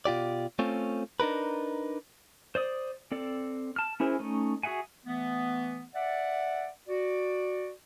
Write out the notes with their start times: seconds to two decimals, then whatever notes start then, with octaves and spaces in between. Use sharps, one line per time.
0.05 B2 F4 G4 D5
0.59 A3 C4 C#4 F4
1.20 D4 D#4 A#4 B4
2.55 C5 D5 D#6
3.12 C4 A4 D5
3.76 A5 F6
4.00 C#4 E4 G#4 A#4 C5
4.19 A3 C#4 D#4
4.63 F#4 G#4 E5 F#5 G#5
5.05 E3 A3 B3
5.94 D5 E5 F#5
6.88 F#4 D5